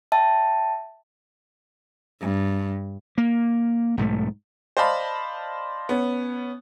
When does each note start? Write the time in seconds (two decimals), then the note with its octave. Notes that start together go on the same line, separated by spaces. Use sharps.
0.12 E5 G5 A5
2.21 G2
3.18 A#3
3.97 B1 G#2 F3 A3
4.77 C5 D5 D#5 F5 A5 B5
5.89 B3 C#4